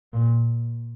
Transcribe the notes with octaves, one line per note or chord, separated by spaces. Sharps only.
A#2